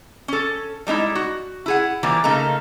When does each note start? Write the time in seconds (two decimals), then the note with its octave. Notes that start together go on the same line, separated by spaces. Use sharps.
0.28 C#4 A4
0.87 G3 G#3 D#4 E4
1.15 F#4
1.66 E4 G#4 F#5
2.03 E3 F3 G3 A#3
2.24 C#3 A3 A#3 D#4 A#5